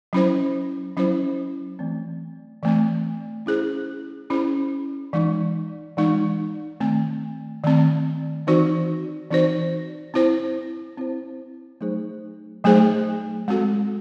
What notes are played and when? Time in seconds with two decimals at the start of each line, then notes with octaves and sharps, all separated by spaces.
0.13 F#3 C#4 E4 C5
0.97 F#3 C#4 E4 C5
1.79 E3 A3 C4
2.63 E3 A3 C4
3.46 C#4 E4 G#4 C5
4.30 C#4 E4 G#4 C5
5.13 E3 G#3 D#4
5.97 E3 G#3 D#4
6.80 D#3 A3 C4
7.64 D#3 A3 C4
8.47 E3 C4 D#4 F#4 C5
9.31 E3 C4 D#4 F#4 C5
10.14 C4 E4 C5
10.97 C4 E4 C5
11.81 F#3 A3 D#4 G#4 C5
12.64 F#3 A3 D#4 G#4 C5
13.48 G#3 C4 F#4 A4